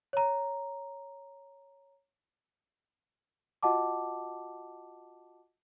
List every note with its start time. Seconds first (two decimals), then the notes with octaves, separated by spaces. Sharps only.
0.13 C#5 A#5
3.63 F4 F#4 D#5 F#5 A5 D6